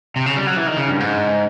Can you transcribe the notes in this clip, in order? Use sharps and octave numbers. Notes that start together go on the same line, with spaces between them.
C3
C#3
G3
F#3
E3
D#3
C#3
G2
G#2